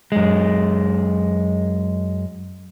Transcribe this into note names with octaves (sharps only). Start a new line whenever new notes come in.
F#2 G#3